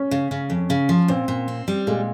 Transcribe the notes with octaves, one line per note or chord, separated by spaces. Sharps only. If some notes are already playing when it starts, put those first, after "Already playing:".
Already playing: C#4
C#3
C#3
F2
C#3
F3
A#2 C4
A#2
C4
G3
A#2 G#3